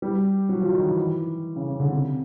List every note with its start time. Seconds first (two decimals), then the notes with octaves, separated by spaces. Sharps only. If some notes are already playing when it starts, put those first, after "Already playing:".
0.02 G3
0.49 F#3
0.61 F3
0.73 D#3
0.85 E3
1.56 C#3
1.68 C#3
1.80 D3
1.92 C3